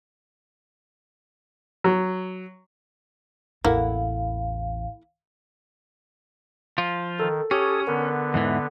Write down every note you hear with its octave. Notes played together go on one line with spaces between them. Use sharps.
F#3
A1 E2 A#3 E4 A4 F5 F#5
F3 F4
D#3 A4
C#4 G4 A4 C#5 D#6
D3 B3 A#4
E2 G#2 E3